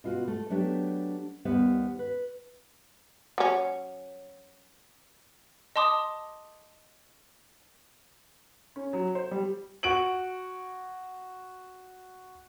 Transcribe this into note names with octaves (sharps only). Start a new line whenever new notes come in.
B2 F4 F#4
A3
F#3 A3 B3 D4 G4
D#2 G3 B3 C5
B4
F#3 C#4
D#5 A5 C6 D6 D#6
C#4
F#3
C5
G3
F#4 D7 F#7